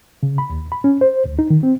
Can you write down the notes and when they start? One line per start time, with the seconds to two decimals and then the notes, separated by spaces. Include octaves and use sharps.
0.23 C#3
0.38 B5
0.50 D#2
0.72 B5
0.84 C#4
1.01 C5
1.26 D2
1.39 D#4
1.50 D#3
1.63 C4